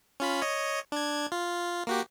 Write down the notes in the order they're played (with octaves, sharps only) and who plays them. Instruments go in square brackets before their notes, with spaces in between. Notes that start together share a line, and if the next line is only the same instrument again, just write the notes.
[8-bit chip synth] C#4 F4 B5
C#5 D#5
D4 G#6
F4
A#3 F#4 G4